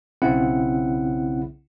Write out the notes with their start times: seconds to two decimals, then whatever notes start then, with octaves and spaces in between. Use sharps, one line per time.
0.22 B1 C#3 C4 E4 F#5